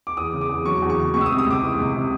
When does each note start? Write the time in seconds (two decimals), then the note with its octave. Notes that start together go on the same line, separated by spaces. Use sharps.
0.07 D6
0.17 E2 D#6
0.33 C#3
0.41 D6
0.49 E2
0.66 F#3 C#6
0.82 E2
0.90 C#6
0.98 C#3
1.14 C#2 C#6
1.21 E6
1.26 D#6
1.30 C3
1.38 D#6
1.46 C#2 D6
1.63 E3
1.79 C#2
1.95 C3